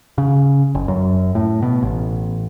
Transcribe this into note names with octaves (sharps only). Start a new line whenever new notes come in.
C#3
F#1
F#2
A2
B2
A1